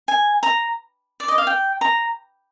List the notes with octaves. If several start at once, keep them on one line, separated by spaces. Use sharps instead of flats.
G#5
A#5
D5
D#5
F5
G5
A#5